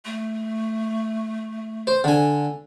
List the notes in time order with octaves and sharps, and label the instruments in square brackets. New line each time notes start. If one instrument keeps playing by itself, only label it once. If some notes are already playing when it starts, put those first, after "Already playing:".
[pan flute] A3
[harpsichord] C5
D3 G#5